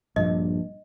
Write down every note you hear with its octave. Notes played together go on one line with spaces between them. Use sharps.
A#1 G2 D#5